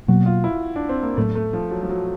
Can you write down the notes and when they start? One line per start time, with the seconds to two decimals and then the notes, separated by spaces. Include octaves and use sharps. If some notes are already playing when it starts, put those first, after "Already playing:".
0.08 B2 F#3 A#3 F#4
0.26 F4
0.44 E4
0.76 D4
0.89 C4
1.03 A#3
1.17 A2 F#3 A3 B3 D4
1.35 A3
1.53 F3
1.71 F#3
1.83 F3
1.89 F#3